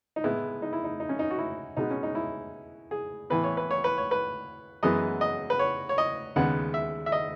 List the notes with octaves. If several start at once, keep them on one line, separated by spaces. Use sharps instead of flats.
D#4
A2 G#3 B3 E4
D#4
E4
D#4
D#4
C#4
D#4
F#4
E4
B2 G#3 B3 D#4
C#4
D#4
E4
G#4
A2 E3 B3 B4
C#5
B4
C#5
B4
C#5
B4
F#2 E3 G#3 B3 D#5
D#5
B4
C#5
C#5
D#5
D#2 C#3 G#3 B3 F#5
E5
E5
D#5